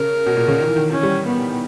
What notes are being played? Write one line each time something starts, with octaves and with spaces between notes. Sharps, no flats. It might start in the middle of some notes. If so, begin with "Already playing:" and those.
Already playing: C#3 A#4
B2
A#2
C#3
D#3
E3
D#3
E3 C#4
G3
B3